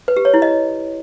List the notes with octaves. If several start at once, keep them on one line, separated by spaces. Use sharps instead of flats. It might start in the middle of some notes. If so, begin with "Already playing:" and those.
B4
G4
C#5
E4
D#5